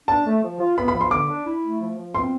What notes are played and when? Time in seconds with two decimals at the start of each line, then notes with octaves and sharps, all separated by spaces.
0.08 D4 A5
0.26 A3
0.43 F3
0.60 F4
0.78 B3 B5
0.88 B5
0.94 F3
1.01 C6
1.11 D3 D6
1.29 D4
1.46 E4
1.63 A3
1.81 F3
1.98 F3
2.15 C4 C6